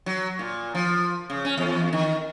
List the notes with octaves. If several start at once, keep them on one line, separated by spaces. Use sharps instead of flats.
F#3
A#2
F3
C#3
C#4
E2
D#3